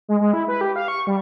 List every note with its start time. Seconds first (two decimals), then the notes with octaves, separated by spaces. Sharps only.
0.08 G#3
0.20 G#3
0.33 E4
0.48 B4
0.61 G4
0.76 F5
0.88 C#6
1.07 G3